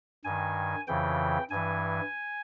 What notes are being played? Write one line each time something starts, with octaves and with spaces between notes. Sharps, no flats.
G2 D#3 G#5
F2 C#3 E3 G5
G2 E3 G#5